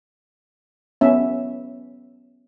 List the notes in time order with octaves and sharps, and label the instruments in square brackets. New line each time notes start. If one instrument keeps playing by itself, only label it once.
[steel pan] B3 C#4 E5